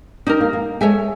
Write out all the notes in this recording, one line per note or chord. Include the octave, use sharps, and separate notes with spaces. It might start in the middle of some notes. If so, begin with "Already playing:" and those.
D4 D#4 G4 A#4
A#3
A#3
G#3 A4 C#5 E5 G#5